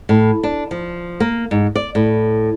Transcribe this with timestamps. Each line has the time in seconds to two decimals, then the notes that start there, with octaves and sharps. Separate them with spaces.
0.09 A2
0.43 D4
0.71 F3
1.20 A#3
1.51 G#2
1.76 D5
1.95 A2